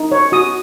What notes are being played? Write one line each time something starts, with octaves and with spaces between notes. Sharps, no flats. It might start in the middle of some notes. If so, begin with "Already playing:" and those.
Already playing: D#4
C#5
F#4 D#6